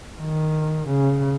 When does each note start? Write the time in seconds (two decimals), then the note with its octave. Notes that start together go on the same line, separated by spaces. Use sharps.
0.21 D#3
0.89 C#3